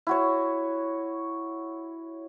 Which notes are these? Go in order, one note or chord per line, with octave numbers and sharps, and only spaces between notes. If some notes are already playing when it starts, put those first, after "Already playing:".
E4 F#4 C#5